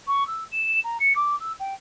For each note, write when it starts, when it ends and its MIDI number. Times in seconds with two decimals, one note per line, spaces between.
0.07 0.26 85
0.27 0.44 88
0.51 0.79 100
0.84 0.97 82
1.00 1.13 97
1.15 1.35 86
1.40 1.52 88
1.59 1.73 79